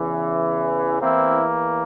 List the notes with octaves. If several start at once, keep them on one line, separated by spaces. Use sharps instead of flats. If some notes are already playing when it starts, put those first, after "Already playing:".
Already playing: E2 C#3 E3
E2 E3 A#3 C4 E4